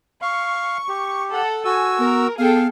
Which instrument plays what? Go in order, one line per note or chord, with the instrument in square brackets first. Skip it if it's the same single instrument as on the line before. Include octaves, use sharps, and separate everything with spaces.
[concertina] F5 [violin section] C#6
[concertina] G4
[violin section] A4 F#5
[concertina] F#4 E6 [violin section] G#5
[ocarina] B3 [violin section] A#4
[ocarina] B3 [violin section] G#4 A4 G5 [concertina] F5